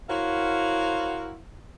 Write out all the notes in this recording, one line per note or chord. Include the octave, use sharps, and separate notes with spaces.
E4 F#4 A#4 C5 C#5 F5